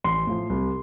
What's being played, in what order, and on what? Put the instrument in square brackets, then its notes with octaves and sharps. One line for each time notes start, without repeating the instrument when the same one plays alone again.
[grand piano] A1 C6
A2 F3
C2